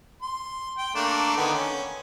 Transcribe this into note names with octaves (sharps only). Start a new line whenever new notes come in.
C6
G5
A3 A#3 D4
D3 D#3 B3
C#4